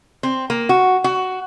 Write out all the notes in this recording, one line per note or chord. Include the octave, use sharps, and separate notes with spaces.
C4
A#3
F#4
F#4